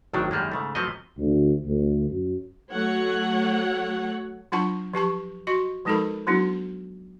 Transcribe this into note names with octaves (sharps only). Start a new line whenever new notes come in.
G#1 A2 D#3 F#3 D4
F#2 D#3 G3 G#3 A#3
G#2 C#3 A3
F3 F#3 A3 B3 C4 D#5
D2
D2
F#2
F#3 A3 C#5 F#5
F#3 D4 F4 F#5 A5 C#6
F3 G4 A5 C#6
F#4 D#5 C#6
F3 G#3 D#4 A4 A#4 B5
F#3 B3 D4 E4 F#4